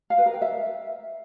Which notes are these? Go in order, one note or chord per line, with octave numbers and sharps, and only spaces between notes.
F5
B4
A#4
G5
E5